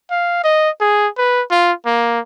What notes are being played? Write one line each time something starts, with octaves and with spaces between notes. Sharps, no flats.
F5
D#5
G#4
B4
F4
A#3